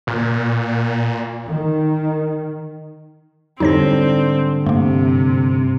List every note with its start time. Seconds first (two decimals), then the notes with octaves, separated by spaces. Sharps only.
0.07 A#2
1.48 D#3
3.60 G#2 D3 G3 C4 D#4 C#5 A#6
4.66 G2 C3 A3 A#3